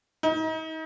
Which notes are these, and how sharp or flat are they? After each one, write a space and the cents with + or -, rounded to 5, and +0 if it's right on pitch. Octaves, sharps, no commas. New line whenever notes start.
D#4 +35